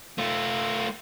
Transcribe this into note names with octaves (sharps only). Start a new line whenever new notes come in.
A3 F4